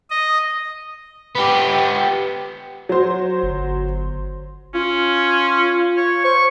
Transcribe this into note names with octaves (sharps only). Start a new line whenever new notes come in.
D#5
B3 G4
F#3 C5
G1
C#4 F4
C#5
C5 C#6